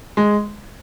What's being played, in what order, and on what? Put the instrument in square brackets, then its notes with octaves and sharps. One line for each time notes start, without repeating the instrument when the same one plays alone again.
[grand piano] G#3